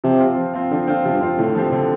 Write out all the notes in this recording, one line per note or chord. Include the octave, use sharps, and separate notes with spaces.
C3 F3
C4 F4
F3
C4 F4
D3 F3
D3 C4 F4
C3 F3
G2
F2 C4 F4
A2 D3
F3 C4 G4
D3